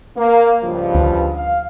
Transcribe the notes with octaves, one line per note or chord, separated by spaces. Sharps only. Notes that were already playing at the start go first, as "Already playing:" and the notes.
A#3
C#2 G2 F3
D2
F5